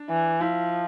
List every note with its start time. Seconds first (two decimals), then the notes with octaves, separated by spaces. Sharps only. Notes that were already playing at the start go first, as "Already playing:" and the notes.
Already playing: D4
0.10 E3
0.41 F3 E4